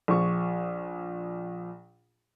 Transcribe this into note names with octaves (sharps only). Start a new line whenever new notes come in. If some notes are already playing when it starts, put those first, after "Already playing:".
A#1 F3 C#6